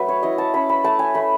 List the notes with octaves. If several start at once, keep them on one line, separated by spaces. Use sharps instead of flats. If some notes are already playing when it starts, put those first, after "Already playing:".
Already playing: F#3 A3 C#4 B4
C#5
E4 D#5
A5
C#4 B5
B5
A3 A5
G#5
A3 B5